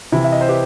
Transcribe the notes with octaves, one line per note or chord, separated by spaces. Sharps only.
C3 E3 E4
E5
D#5
C5
G4 B4